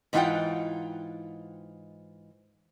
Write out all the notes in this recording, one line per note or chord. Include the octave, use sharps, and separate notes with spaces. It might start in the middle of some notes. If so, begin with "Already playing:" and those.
G#2 E3 D#4 F4 F#5 G5